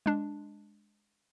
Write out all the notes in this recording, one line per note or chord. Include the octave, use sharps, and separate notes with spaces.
G#3 D4